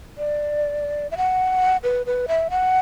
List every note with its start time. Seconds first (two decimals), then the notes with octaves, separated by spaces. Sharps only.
0.18 D5
1.11 E5
1.17 F#5
1.83 B4
2.06 B4
2.28 E5
2.50 F#5